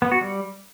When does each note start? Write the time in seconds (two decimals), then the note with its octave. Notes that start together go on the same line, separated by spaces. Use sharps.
0.02 B3
0.12 F#4
0.21 G3